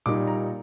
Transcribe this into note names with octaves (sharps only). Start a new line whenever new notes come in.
A#2 G3 A#3 D#4 D6
A#5